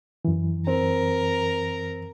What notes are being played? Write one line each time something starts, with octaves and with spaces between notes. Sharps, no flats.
F#2 E3
C4 A#4